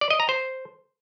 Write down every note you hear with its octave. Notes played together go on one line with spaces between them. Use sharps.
D5
D#5
A#5
C5